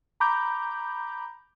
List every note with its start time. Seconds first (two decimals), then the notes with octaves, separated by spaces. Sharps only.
0.20 A#5 B5 D6 G6